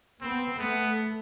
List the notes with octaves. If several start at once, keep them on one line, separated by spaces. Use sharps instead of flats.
B3 C4
A3 B3